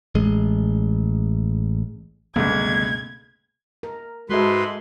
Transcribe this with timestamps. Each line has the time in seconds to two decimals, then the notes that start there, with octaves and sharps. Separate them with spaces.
0.15 A1 G#3
2.36 G1 C#2 B2 A3 A#3 G#6
3.83 A#4
4.30 G#2 G#3 F#4 A4 B4 E5 C6